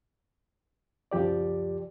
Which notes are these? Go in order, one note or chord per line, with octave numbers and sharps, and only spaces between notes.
C#2 F#2 F3 G4 D5